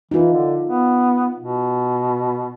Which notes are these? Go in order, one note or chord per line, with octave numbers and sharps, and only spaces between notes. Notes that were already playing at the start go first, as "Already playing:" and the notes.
E3 D#4 F4
D3
B3
B2